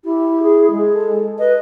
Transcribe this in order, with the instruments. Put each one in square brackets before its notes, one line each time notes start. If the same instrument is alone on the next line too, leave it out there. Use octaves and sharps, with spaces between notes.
[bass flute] E4 [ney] G4
[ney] G#4
G#3
[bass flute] A4
[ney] B4 [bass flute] D#5